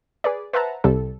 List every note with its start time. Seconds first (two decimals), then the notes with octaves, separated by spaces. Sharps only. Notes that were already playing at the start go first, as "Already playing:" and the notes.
0.24 G#4 B4 D5
0.53 B4 C5 E5 F#5 A5 A#5
0.84 C2 C3 G3 A4